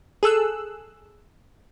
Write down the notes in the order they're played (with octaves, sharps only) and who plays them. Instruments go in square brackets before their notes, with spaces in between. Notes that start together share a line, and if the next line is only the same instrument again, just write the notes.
[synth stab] G#4 A4 E6 F#6